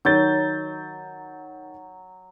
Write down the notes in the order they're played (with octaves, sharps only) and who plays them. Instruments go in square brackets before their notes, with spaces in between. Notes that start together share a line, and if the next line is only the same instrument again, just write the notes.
[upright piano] D#3 G6 A6 [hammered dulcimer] F#3